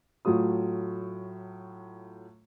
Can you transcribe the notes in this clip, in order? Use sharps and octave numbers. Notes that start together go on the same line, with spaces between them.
A2 F#3 A3 F4 D#6